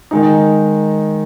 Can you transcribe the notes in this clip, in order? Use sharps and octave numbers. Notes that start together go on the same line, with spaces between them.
D#3 G#3 D#4